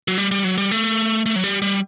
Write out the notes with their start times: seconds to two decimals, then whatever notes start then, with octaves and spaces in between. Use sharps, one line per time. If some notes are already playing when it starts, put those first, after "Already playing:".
0.08 F#3
0.18 G3
0.31 G3
0.44 F#3
0.58 G3
0.71 A3
1.26 A3
1.36 F#3
1.44 G3
1.62 G3